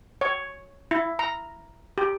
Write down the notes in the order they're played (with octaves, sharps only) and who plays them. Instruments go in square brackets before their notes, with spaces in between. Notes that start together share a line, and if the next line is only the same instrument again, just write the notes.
[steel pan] C#5
E4
A#5
G4